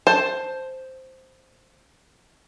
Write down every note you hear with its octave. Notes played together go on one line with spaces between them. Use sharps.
C5 A5